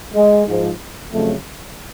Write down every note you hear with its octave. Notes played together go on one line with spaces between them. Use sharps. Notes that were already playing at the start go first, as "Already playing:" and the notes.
G#3
G#2 F3
F2 C#3 F#3 A3